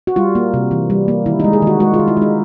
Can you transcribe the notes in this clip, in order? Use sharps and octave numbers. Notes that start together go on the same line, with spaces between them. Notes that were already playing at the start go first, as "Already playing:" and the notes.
F#4
G3 F4
A#3
C3
E3
G3
A#3
D#3 E4
G#3 D#4
G#4
D#3 F#4
G#3 F#4
F4
D#3
E4
G#3 D#4